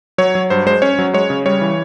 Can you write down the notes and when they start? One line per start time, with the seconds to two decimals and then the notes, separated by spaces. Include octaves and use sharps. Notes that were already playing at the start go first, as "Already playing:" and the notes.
0.18 F#3 C#5
0.35 F#3
0.50 G2 C5
0.66 G#3 C5
0.82 C#4 C#5
0.99 F#3
1.14 G#3 C#5
1.30 C#3
1.45 G3 C#5
1.61 E3